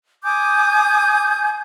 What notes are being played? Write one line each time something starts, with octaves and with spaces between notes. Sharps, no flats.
G#5 D6 D#6 G6